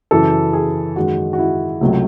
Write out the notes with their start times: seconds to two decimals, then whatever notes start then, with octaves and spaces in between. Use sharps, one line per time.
0.11 F#2 C#3 E3 A4
0.53 G#4
0.96 F#2 D#3 G#3 F#4
1.33 F#4
1.39 E4
1.81 C#2 C3 F#3 A3